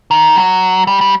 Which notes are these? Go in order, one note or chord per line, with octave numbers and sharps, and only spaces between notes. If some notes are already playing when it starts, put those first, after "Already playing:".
D#3
F#3
G3
G3